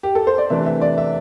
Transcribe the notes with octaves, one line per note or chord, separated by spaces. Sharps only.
G4
A4
C5
D5
C3 E3 A3 D4 E5
E5
D5
E5